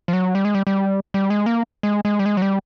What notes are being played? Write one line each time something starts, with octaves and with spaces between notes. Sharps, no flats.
F3
F#3
G3
G#3
G3
G3
G3
G#3
A#3
G#3
G#3
G3
G#3
F#3
G3